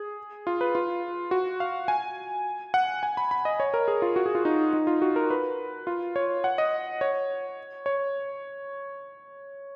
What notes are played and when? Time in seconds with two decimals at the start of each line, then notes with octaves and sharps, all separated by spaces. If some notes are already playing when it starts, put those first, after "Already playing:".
Already playing: G#4
0.47 F4
0.61 B4
0.75 F4
1.31 F#4
1.60 F5
1.88 G#5
2.74 F#5
3.03 G#5
3.17 B5
3.31 B5
3.45 D#5
3.60 C#5
3.74 A#4
3.88 G#4
4.02 F4
4.16 F#4
4.26 G#4
4.35 F4
4.45 D#4
4.73 D#4
4.87 F4
5.02 F#4
5.16 A#4
5.30 B4
5.87 F4
6.16 C#5
6.44 F#5
6.58 D#5
7.01 C#5
7.86 C#5